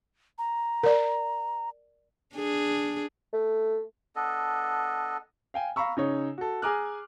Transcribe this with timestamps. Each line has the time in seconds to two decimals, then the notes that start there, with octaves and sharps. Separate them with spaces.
0.38 A#5
0.83 A#4 D5
2.35 D4 G#4
3.33 A3
4.16 B3 D4 A4 D#5
5.54 F5 G5 G#5
5.76 F5 A#5 B5 C#6 E6
5.97 C#3 D#4 C#5
6.38 F#4 A4
6.62 G#4 G#5 A#5 D6 F6 F#6